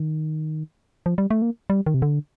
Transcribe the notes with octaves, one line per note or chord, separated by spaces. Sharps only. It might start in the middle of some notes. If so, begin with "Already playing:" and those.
Already playing: D#3
F3
G3
A3
A#3
G3
D#3
C3
D3